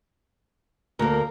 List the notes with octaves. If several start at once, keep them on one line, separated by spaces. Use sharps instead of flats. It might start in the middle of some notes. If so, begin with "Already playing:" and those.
D2 A#3 A#4